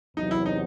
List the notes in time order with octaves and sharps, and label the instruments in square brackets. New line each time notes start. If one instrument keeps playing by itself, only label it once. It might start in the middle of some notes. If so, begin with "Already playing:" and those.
[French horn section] E2 C3 F#3 [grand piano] D#4
[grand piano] E4
D#4